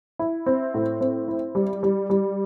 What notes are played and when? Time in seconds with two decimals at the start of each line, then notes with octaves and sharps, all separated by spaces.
0.19 E4
0.46 C4
0.74 A2
1.01 C4
1.28 E4
1.55 G3
1.83 G3
2.10 G3